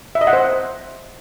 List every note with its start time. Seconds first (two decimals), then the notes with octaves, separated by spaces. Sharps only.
0.15 E5
0.21 D#5
0.27 F#5
0.33 C5
0.39 E5